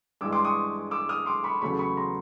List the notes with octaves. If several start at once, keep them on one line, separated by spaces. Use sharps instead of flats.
G2 E3 G#3 D6 E6
C6 D6
C#6 D#6
D6 E6
D#6 F6
C6 D6
B5 C#6
E2 C#3 F#3 A3 B5 C#6
B5 C#6
A#5 C6